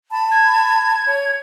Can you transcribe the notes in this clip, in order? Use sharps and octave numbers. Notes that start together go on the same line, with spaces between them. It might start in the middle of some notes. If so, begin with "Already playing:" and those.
A5 B5
G#6
C#5